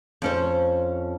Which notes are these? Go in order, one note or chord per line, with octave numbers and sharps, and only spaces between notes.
F2 C#4 C5